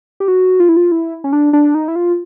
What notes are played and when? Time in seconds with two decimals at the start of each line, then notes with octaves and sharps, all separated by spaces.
0.20 G4
0.28 F#4
0.60 F4
0.69 E4
0.77 F4
0.92 E4
1.24 C#4
1.33 D4
1.53 D4
1.75 D#4
1.88 E4
1.96 F4